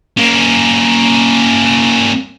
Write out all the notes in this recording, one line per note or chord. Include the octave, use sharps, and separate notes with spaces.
A#3 C#4